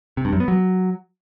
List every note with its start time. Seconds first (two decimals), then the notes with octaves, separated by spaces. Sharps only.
0.17 C3
0.25 G2
0.33 F#2
0.40 B3
0.48 F#3